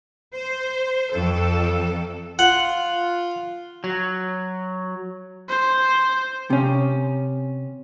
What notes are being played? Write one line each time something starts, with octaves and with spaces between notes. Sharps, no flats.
C5
F2 A4
F4 F#5
F#3
C5
C3 C#4